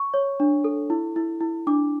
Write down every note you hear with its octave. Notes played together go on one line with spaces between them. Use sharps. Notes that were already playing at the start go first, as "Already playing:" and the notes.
Already playing: C#6
C#5
D4
A4
E4
E4
E4
D4 D6